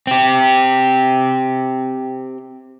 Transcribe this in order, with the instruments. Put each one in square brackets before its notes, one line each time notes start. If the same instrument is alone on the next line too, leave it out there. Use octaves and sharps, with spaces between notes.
[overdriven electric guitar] C4 G4